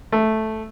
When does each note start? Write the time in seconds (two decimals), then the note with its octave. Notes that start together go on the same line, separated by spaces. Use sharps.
0.12 A3